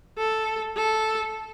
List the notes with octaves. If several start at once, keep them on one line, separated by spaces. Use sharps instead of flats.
A4
A4